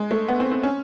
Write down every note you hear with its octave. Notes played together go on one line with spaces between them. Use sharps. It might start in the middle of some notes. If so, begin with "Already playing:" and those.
Already playing: G#3
A3
B3
C4
C4
C#4